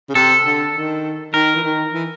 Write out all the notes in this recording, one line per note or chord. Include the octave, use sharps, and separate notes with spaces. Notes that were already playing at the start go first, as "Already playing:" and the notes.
C#3
C3 A4
D3
D#3
D#3 A#4
E3
D#3
E3